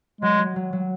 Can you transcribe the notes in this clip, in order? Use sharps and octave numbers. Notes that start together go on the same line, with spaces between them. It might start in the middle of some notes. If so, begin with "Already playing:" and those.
F#3 G#3
F#3
F#3
F#3